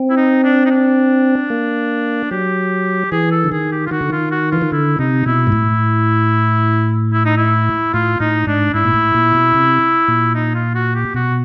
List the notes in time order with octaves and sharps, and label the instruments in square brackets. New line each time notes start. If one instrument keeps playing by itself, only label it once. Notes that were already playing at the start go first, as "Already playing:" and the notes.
Already playing: [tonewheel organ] C4
[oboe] E4
D#4
D4
D#4
D4
[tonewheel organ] A#3
[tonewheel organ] F#3 [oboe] G4
[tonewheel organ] E3 [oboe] G#4
[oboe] A4
[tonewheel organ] D3
[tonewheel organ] D#3 [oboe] G#4
[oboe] G4
F4
[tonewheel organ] D#3 [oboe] F#4
[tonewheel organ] D3
[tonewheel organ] D#3 [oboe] F4
[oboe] F#4
[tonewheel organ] E3 [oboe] F4
[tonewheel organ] D#3
[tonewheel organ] D3 [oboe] E4
[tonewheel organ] C3 [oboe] D#4
[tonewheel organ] B2 [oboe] E4
[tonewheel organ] G#2
A2
[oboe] E4
D#4
E4
[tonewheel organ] A2 [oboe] F4
[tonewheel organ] A2 [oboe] D#4
[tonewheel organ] G#2 [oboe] D4
[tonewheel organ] G#2 [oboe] E4
[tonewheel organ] A#2
A2
A#2
B2
C3
A#2
[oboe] D#4
F4
F#4
G4
[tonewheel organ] B2 [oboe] F#4